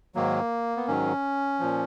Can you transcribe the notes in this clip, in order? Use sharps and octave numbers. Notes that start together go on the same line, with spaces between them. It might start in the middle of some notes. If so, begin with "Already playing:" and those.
G#2 D#3 F#3 A#3
B3
G#2 D#3 F#3 C#4
A#2 F3